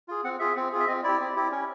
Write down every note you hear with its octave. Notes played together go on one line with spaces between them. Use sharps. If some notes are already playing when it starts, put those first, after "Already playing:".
F4 G#4
C4 F#5
F4 G#4 E5
C4
F4 G#4
E5
C4 D#5
E4 G4 D5
C4
E4 G4
C#4